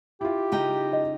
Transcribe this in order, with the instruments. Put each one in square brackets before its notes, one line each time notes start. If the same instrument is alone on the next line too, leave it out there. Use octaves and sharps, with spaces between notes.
[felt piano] E4 F4 [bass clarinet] G4
[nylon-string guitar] C#3 D#4 G5
[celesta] D#5